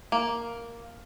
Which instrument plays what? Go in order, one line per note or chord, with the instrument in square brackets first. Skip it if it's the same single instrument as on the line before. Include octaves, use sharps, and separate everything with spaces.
[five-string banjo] A#3